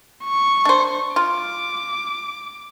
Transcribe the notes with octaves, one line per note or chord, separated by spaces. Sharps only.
C#6
D4 C5
F4 D6